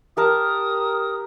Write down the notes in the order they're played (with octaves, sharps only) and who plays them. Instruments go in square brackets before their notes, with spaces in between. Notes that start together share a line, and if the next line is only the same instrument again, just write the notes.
[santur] G4 A#4 A5 [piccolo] D#6